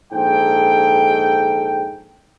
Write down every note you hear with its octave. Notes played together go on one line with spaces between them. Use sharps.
A#1 G#2 A4 G5